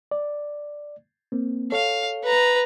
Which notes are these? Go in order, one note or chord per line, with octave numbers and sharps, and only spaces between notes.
D5
A#3 C4
A4 C#5 F5
B4 A#5